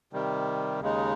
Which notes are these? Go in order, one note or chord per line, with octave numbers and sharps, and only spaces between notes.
C3 D#3 G3
D#2 C#3 G#3 D#4